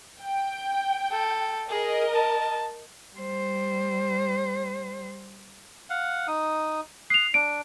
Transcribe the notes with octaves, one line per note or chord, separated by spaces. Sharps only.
G5
A4
G#4 A#4 D#5
A5
G3 C5
F5 F#5
D#4 D#6
D#6 F#6 C7 F7
D4 D7